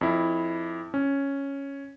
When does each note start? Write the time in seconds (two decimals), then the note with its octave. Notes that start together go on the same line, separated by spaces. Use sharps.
0.01 F2 E4
0.94 C#4